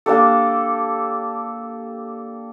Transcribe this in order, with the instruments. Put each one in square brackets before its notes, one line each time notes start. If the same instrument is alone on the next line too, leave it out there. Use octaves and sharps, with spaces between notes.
[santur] A#3 D4 G4 A4